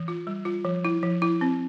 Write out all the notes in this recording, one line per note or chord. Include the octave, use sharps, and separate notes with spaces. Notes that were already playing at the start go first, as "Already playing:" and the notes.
Already playing: E3
F4
G3
F4
F3
E4
F3
E4
C4